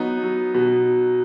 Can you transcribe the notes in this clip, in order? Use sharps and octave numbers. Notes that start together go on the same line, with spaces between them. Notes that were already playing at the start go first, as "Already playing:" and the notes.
Already playing: F#3 B3 D#4
F#3
B2